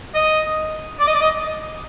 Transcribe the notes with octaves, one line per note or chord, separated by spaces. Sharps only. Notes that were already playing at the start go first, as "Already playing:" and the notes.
D#5
D5
D#5
D5
D#5